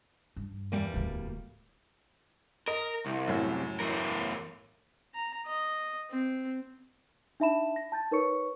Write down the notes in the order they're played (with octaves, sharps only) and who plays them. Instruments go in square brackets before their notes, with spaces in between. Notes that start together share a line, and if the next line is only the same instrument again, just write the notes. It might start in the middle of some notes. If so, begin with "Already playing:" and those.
[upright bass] G2
[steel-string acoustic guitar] E2 G3 A#3
[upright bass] D1 D2
[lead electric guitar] A#4 [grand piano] D#5
[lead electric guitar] C2
[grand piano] F#2 A2
[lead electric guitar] E2 A#4
[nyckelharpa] A#5
D#5
C4
[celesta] D4 D#4 E5 A5 B5 E7
A#6
A5 G6 A6
D#4 A#4 B4 C#5 C#6 C#7